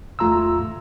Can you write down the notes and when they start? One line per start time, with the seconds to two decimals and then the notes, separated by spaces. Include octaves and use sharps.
0.19 E2 A3 F4 A#5 C6 E6